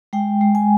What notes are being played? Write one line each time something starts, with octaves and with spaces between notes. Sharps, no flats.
G#3 G5
G#3
G#5